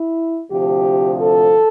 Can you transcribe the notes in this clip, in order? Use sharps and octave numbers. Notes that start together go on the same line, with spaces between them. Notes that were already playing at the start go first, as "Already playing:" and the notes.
Already playing: E4
D2 C3 F3 G4
A4